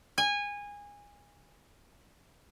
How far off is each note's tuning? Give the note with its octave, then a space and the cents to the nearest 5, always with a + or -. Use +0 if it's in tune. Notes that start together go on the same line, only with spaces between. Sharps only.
G#5 -20